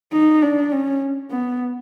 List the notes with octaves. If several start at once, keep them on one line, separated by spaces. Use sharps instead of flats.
D#4
D4
C#4
B3